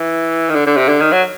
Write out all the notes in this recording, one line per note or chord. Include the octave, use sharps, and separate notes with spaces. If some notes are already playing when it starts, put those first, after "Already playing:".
Already playing: E3
D#3
D3
D3
C3
D3
D#3
F#3